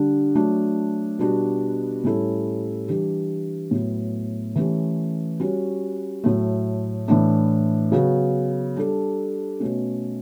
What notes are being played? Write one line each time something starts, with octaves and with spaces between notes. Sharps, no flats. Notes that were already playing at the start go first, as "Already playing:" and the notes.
Already playing: D3 G3 D4
F#3 A3 D4
B2 G3 B3 D4 F#4
A2 G3 C#4 E4 A4
E3 G3 D4 G4
A2 F#3 B3
E3 A3 C#4 G4
G3 C#4 F#4
A2 F#3 A3
A2 E3 A3 D4
C#3 F#3 B3 F#4
G3 D4 A4
B2 A3 C#4